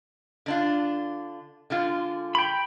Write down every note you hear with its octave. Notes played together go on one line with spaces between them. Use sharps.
D3 D4 F4
D3 G#3 F4
G5 B5